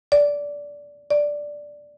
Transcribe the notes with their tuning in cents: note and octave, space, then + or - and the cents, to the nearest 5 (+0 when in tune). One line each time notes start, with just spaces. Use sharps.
D5 -15
D5 +0